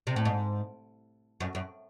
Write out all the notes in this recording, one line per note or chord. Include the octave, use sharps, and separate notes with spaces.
C3
A2
G#2
F#2
F#2